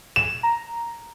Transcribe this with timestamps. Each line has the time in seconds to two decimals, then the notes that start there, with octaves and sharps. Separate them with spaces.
0.16 E7
0.43 A#5